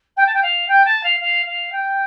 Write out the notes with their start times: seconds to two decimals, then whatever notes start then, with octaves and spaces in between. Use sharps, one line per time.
0.16 G5
0.26 A5
0.34 G5
0.42 F5
0.68 G5
0.85 A5
1.03 F5
1.20 F5
1.45 F5
1.72 G5